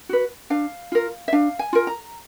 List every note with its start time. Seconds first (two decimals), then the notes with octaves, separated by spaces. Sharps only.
0.09 F#4 B4
0.50 D4 F5
0.92 F4 A#4
1.28 E5
1.33 D4 F5
1.59 G#5
1.73 F4 A#4
1.87 A#5